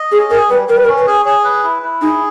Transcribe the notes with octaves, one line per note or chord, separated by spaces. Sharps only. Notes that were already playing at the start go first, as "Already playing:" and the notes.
Already playing: D#5
C#4 G#4
G#4 A#4
G3 B4
G3 A#4
B4
A#4
C#4
B4
G#4
G#4 C#5
B4
E4
E4
D#4 G#4